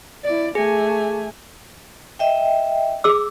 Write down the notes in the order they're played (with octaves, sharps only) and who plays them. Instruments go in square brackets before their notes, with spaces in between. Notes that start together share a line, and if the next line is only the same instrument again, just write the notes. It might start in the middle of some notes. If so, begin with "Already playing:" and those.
[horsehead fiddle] E4 D5
[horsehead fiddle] A3 G#5 [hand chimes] G#4
[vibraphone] D#5 E5 G5
[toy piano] G#4 D6 E6